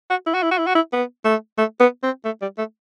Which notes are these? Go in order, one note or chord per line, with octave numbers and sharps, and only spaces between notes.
F#4
E4
F#4
E4
F#4
E4
F#4
E4
B3
A3
A3
B3
C4
A3
G3
A3